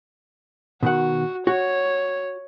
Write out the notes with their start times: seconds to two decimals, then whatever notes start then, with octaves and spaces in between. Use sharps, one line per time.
0.83 B2 D#3 F#4 F#5
1.47 F#4 C#5